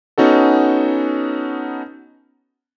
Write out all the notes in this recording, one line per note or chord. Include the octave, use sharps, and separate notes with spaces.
B3 C#4 D#4 F#4 A4